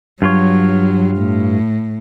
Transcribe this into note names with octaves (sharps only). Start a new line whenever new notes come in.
G2 F#3 F4 C#5
A2